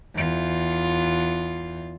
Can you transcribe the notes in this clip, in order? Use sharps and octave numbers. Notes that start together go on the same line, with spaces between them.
E2 F4